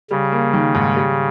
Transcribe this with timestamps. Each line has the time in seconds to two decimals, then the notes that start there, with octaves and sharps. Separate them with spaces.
0.11 C#3 G3
0.32 A#3
0.53 D#3
0.75 G#2
0.96 G3